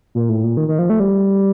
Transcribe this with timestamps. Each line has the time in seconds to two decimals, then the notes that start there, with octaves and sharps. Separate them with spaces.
0.15 A#2
0.29 A2
0.44 A#2
0.57 D#3
0.68 D#3
0.79 F3
0.90 A3
1.00 G3